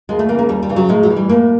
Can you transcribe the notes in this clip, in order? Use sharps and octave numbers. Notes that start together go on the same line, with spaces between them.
D#2 G#3
A3
C#3 E3 A#3
A#3
D#2 G3
G3
C#3 E3
F#3
A2 G#3
F#3
E3
G3
A2 A#3